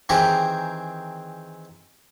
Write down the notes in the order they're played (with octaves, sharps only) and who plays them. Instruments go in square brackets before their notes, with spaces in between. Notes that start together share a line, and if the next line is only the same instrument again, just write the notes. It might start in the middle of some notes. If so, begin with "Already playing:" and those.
[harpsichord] D#3 E3 C4 G4 G#4 A#4